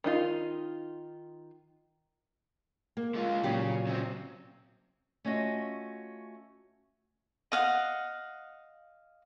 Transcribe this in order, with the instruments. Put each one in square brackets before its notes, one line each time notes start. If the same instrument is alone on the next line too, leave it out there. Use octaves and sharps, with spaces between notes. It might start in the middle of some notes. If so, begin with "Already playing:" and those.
[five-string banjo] D#3 D#4 F4
[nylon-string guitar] A#3
[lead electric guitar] G#3 F4
[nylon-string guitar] A#2 F#3 G4 [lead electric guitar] C#3
[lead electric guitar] C#3 C4
[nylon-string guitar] A3 C#4 F4 F#4 D#5
[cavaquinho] D#5 F5 F#5